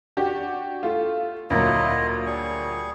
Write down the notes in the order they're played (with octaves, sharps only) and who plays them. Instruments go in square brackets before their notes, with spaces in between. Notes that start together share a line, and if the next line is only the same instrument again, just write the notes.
[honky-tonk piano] D4 F#4 G4
A3 F4
[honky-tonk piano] D2 A#2 F#3 [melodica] E4 F4 D#5
[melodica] G3 G#4 C#6